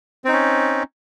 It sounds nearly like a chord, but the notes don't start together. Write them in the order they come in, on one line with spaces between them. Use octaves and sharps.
C4 D#4 C#4